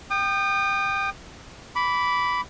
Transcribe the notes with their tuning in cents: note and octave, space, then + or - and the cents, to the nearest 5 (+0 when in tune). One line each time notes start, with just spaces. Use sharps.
G5 +0 D#6 -40
B5 +0 D6 -25